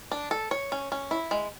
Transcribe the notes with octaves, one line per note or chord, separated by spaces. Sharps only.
D4
A4
C#5
C#4
C#4
E4
G#3